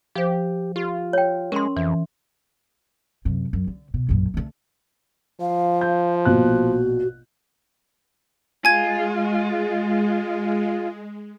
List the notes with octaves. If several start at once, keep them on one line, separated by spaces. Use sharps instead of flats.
F3 G4 C5
F4 G4
C#5 G5
G#3 C#4 A#4 C6
F2 E3
F#2 C3
F#2
D3
B2
A#1 F#2
D3 A3
F3 F5
G6
A#1 B2 F#4 F#6
G#3 F4 G#5 G#6